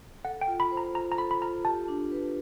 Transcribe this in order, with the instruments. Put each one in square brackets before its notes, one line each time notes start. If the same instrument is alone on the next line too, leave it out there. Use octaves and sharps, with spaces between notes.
[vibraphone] A4 [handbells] F#5
[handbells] G5
[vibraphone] F4
[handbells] B5
[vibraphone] C5
[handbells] A#5
[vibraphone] F4 [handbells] A#5
[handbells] A#5
[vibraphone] A4 [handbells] B5
[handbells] B5
[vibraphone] F4 [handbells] A#5
[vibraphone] G4 [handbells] A5
[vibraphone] D4
B4